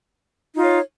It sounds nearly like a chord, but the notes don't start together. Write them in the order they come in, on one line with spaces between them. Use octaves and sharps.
D#4 F4 C#5